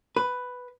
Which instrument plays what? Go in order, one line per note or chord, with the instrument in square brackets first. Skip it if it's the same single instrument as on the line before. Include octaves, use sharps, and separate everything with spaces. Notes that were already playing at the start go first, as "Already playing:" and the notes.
[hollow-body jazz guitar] B4